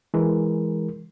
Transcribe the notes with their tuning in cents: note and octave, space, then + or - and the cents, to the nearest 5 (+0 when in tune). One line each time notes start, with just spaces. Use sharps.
E3 +0 G#3 +0 A#4 +0